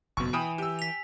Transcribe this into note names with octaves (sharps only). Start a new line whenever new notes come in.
F#1 F2 B2 C#6
E3 G5 G#5 B5 D#6
G4 E6
B6 F7